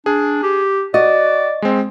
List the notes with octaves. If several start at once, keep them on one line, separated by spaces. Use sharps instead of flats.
D4 G#4
G4
F#4 D5 D#5
G#3 C4